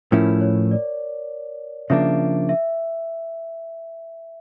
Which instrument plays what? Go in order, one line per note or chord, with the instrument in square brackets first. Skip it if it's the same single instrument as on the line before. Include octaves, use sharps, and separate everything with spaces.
[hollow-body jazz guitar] A2 F3 C#4 E4 [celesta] A#4
[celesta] C#5
D5
[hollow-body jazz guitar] C#3 F3 A#3 D4 [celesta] E5
[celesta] E5